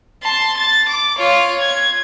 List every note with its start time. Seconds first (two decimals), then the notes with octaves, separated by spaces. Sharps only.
0.23 A5 C6
0.57 A6
0.88 D6
1.17 F4 C#5
1.61 G#6